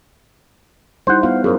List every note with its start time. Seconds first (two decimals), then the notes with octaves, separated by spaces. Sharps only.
1.07 G3 D#4 E4 C5 F#5
1.23 B3 F4 F5
1.44 F#2 G#4 A#4 C5